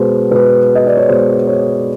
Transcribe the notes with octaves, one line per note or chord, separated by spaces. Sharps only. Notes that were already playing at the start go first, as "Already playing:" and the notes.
Already playing: B2 G#3 B3 C5
B2 G#3 B3 B4
D#5
D5
C#5
B2 G#3 B3 C5
C#5